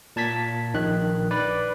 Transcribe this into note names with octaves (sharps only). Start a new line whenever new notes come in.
A#2 A5 G#6 B6
A#1 D#3 F#6
B4 D5